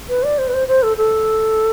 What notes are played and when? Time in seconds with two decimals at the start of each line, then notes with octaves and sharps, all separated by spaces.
0.09 B4
0.23 D5
0.38 C5
0.48 B4
0.54 C5
0.68 C5
0.83 A4
0.97 A4